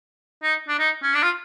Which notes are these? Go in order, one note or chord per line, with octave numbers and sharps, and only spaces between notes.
D#4
D4
D#4
C#4
D4
F4